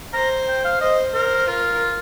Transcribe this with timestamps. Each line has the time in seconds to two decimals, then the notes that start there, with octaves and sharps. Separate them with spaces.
0.14 C5 A#5
0.48 G5
0.65 F5
0.81 C5 D#5
1.14 A#4 C5
1.47 F4 A#4